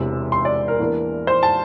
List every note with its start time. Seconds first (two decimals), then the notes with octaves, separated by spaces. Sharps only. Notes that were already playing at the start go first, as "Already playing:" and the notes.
Already playing: E1 E2 C3 E6
0.32 C6
0.45 D5
0.68 A#4
0.80 E2 E3 A#3 D4
1.27 C5
1.43 A5